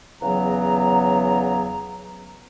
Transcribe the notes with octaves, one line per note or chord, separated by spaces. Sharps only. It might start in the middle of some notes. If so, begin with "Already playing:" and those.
E2 C#3 F#3 B3 A#5